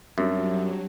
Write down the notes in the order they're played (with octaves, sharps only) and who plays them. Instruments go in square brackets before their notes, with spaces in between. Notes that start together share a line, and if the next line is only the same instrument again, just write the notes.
[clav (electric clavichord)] F#2 [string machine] F#3 [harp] G3 C4 D4 [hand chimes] E5